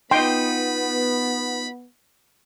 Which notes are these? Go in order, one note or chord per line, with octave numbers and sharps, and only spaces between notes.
B3 D#4 F4 D#5 G5 B5 C6